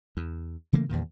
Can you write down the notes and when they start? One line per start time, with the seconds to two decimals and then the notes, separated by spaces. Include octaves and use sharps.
0.17 E2
0.73 C#3 E3 A3 A#3
0.89 E2 G2 A#2 D#3